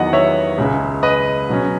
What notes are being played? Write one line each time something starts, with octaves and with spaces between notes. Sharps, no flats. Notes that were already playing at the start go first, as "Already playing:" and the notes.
Already playing: E2 D#3 F#3 B3 D#5 F#5
C#5 E5
C#2 C#3 G#3
B4 D#5
B2 F#3 C#4